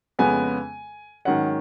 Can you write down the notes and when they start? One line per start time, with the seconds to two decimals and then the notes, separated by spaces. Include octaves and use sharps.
0.19 F2 C#3 G#3 B3 G#5
1.25 G#2 D#3 F#3 C#4 F#5